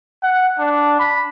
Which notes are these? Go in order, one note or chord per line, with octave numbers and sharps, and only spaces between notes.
F#5
D4
B5